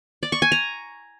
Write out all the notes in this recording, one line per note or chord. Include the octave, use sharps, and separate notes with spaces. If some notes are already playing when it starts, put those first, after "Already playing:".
D5
C#6
G#5
A#5